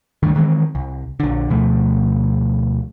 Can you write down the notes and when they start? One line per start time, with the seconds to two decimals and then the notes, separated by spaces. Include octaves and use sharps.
0.23 D2 G2 D#3
0.36 D#3 E3 G#3 C4
0.75 C2
1.20 A#1 D3
1.50 D2 B2 F3 A3